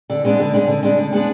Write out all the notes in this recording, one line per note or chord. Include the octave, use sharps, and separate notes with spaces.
D3
G#3 B3 D4
D3
G#3 B3 D4
D3
G#3 B3 D4
D3
G#3 B3 D4